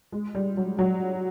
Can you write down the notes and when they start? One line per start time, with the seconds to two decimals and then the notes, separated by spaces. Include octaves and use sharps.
0.12 G#3
0.35 G3
0.57 F#3
0.79 F#3